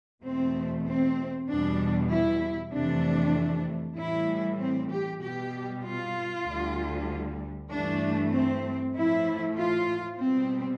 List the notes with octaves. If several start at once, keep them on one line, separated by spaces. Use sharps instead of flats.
E2 B2 A3 C4
C4
E2 B2 G3 D4
E4
F2 C3 E3 A3 D4
A2 E3 G3 E4
C4
G4
B2 G3 G4
F4
D2 D3 G3
G2 E3 A3 D4
C4
A2 F3 A3 E4
F4
B2 G3 C4